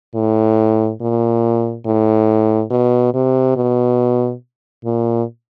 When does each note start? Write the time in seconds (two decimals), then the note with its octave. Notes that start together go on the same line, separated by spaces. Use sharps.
0.15 A2
1.01 A#2
1.86 A2
2.71 B2
3.14 C3
3.57 B2
4.85 A#2